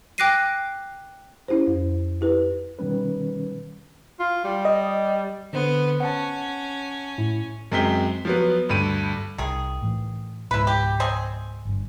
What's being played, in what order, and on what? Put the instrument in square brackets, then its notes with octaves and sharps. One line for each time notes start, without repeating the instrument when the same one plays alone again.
[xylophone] G5 D6 F#6 A#6 C7 D#7
[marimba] C#4 E4 G4 C5
F2
E4 G4 B4
[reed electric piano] B2 D#3 G3 C#4 B4
[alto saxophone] F4
G3
[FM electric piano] D#5
[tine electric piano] D3 C5 [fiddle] B3
[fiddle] C#4 [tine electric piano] F#5 A5
[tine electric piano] A2 E4
[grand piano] F#2 G#3 C4 B6 G7
F3 F#3 B3
D2 G2 B5 D#7
[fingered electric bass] C2 [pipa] D#3 G#4
[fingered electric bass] A2 E3
[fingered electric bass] C#2 G#2 B2 [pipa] E4 B4
[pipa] G4
C4 D#5 G#5
[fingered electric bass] G1 G2